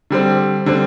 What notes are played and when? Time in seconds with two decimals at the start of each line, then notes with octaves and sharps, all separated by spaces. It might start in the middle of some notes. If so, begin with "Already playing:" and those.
0.10 D3 G3 C4
0.66 D3 G3 C4